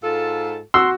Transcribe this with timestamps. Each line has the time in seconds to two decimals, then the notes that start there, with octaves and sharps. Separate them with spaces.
0.04 G#2 F4 A4
0.74 F#4 C6 E6